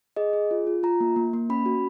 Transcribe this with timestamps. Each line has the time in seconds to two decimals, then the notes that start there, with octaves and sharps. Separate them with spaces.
0.17 G#4 D#5
0.33 G#4
0.51 F4
0.67 F4
0.83 F4 A#5
1.00 A#3
1.16 A#3
1.33 A#3
1.50 C#4 B5
1.66 F#4